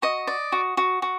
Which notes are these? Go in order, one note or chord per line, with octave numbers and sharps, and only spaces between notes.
F#4 D#5
D5
F#4
F#4
F#4